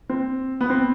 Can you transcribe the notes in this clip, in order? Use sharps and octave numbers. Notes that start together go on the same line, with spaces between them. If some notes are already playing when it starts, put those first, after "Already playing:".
C4
B3
C4